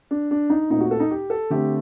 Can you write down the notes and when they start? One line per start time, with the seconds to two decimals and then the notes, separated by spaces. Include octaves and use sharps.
0.11 D4
0.31 D4
0.50 D#4
0.70 A#2 A3 C4 D#4
0.80 F#4
0.91 A4
1.00 D#4
1.11 G4
1.30 A4
1.50 D3 A3 C4 G4